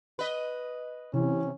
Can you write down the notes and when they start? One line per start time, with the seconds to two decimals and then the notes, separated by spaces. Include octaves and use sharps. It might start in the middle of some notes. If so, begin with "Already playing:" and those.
0.19 B4 D#5
1.14 C3 E3 C#4